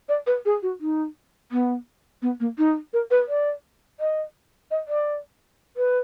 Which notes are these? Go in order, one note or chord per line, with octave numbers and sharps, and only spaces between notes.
D5
B4
G#4
F#4
D#4
B3
B3
A#3
D#4
A#4
B4
D5
D#5
D#5
D5
B4